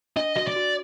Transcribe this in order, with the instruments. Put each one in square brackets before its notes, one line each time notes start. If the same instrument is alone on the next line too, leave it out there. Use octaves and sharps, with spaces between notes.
[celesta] D4 [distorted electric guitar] D#5
[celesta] F#4 [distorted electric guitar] D#5
[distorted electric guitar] D5
[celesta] F#4